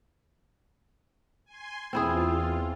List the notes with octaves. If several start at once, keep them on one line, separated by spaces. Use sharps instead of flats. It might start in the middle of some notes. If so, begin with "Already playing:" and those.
G#5 C6
E2 C4 E4 F4 G#4